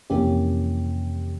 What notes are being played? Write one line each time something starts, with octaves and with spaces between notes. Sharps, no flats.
F2 C3 E3 A#3 C#4 G4